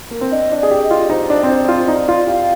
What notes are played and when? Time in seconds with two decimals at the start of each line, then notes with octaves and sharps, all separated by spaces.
0.11 A#3
0.21 C4
0.31 D4 D#5
0.52 D4
0.58 D5
0.63 G#4
0.71 G4
0.84 D#5
0.91 F4
1.10 D#4 C5
1.30 D4
1.43 C4
1.49 D4 C5
1.68 F4
1.88 D#4 D5
2.08 F4
2.27 G4 F5